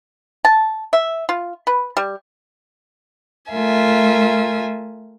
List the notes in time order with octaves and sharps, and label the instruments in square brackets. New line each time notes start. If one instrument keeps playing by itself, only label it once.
[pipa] A5
E5
F4
B4
G3
[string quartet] A3 F4 A#4 E5 G#5